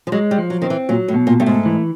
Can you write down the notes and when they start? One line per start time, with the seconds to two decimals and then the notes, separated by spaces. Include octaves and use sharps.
0.07 F3
0.12 F#3 G#3
0.31 G3
0.38 F3
0.50 F#3
0.62 D#3 C4
0.70 E3
0.89 A#2 F#3
1.08 A2
1.14 B2
1.27 A#2
1.40 G2 A3
1.46 G#2
1.65 E3